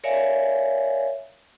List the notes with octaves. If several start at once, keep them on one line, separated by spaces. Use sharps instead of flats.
A#4 C#5 D5 E5 F5 G#5